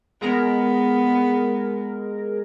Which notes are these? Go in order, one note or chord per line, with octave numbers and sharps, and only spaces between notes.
G#3 B3 G#4 A#4